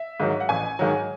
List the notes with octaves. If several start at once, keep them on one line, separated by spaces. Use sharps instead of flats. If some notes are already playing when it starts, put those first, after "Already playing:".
Already playing: E5
G#2 D#3 F#3
F#5
A1 G#5
G#2 D#3 F#3